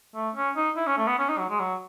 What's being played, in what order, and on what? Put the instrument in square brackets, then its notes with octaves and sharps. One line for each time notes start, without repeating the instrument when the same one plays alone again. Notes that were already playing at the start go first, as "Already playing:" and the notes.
[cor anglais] A3
C#4
D#4
E4
C#4
A3
B3
C#4
D#4
F#3
G#3
F#3